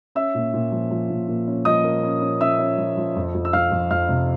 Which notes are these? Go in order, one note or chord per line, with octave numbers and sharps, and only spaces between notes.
C#4 E5 E6
A#2
A#2
F3
F3
A#2
A#2
C#4
F3 D#5 D#6
A#3
C#4
C#4
C#4 E5 E6
C#4
F3
F3
F2
F2
E6
F2 F5 F6
F2
F2 F5 F6
C3